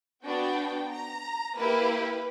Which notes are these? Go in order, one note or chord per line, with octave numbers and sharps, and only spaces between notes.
B3 D4 F#4 G5
A#5
A#3 E4 G4 B4